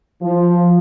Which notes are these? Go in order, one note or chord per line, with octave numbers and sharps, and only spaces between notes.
F3